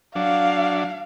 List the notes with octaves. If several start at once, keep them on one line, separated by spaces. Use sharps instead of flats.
F#3 D4 F5